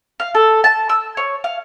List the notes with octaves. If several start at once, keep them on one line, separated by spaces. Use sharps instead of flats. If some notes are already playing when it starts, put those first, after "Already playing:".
F5
A4
A5
E6
C#5
F5